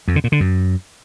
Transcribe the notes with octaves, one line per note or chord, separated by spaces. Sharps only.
F2
D3
A#2
D3
F#2